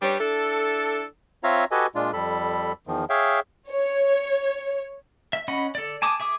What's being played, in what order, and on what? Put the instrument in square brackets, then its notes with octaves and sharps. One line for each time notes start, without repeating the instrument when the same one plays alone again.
[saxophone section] G3 D4 G4 B4 C#5
D4 E4 A4
[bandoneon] C4 F4 C#5 E5 F5 A#5
F#4 G4 A4 B4 D#5 G#5
A#2 G#3 D4 F4
F2 G3 A4 B5
E2 D#3 F3
G#4 C#5 E5 F5 G5
[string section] C#5
[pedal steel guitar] E5
C#4 D#5 F#5 B5
A4 D5
G#5 A5 D6 D#6
G#4 E5 D6 D#6